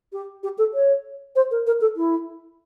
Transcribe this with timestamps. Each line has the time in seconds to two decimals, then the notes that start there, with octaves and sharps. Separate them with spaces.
0.13 G4
0.43 G4
0.58 A4
0.74 C#5
1.36 C5
1.51 A#4
1.67 A#4
1.81 A4
1.96 E4